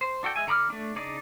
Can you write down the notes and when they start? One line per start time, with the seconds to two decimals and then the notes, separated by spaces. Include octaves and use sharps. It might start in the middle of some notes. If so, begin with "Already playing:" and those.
0.01 C5
0.23 D4 F#4 A4 G5
0.36 G#3 E5 G#5
0.47 D3 A#5 B5 D6 F6
0.70 A3 D4
0.96 C#3 D4 D#4 D5 D6